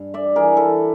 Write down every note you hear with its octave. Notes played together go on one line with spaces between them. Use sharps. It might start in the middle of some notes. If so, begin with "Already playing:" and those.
Already playing: G2
D5 E5
E3 G#4 A#4
A4 B4